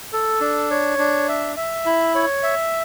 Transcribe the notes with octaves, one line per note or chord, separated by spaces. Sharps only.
A4
D4
C#5
D4
E5
E5
E4
C#5
E5